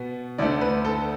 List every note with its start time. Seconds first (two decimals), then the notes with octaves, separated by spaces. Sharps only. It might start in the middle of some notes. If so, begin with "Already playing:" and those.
Already playing: B2 B3
0.38 D2 D3 A3 D5
0.61 B4
0.85 A4